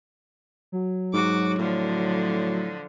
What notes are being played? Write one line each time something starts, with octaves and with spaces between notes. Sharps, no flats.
F#3
G#2 F#4 D6
A2 D3 F3